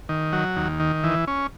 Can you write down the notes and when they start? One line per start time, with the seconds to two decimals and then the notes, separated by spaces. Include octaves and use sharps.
0.09 D#3
0.33 F#3
0.56 D#2
0.80 D#3
1.04 E3
1.27 C#4